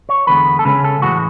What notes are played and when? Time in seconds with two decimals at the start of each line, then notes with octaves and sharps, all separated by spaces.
0.09 C#5
0.27 E2 D3 G#3 B3 B4
0.59 A4
0.65 C#3 G#3 C#4 B4
0.84 A4
1.02 A2 E3 G#3 F#4